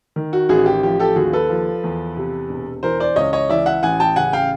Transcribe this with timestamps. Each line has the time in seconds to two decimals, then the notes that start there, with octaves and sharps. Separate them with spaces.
0.16 D#3
0.33 F#4
0.49 A1 F#4 G#4
0.66 G4
0.83 F3 G4
0.99 G4 A4
1.16 D#2 F#4 G#4
1.33 A4 B4
1.50 F3
1.84 E2
2.17 C3
2.49 E1
2.83 E3 A#4 C5
3.00 C5 D5
3.16 C#2 C#5 D#5
3.33 C#5 D#5
3.49 E3 D5 E5
3.66 E5 F#5
3.83 A1 F#5 G#5
4.00 G5 A5
4.16 C#3 F#5 G#5
4.33 F5 G5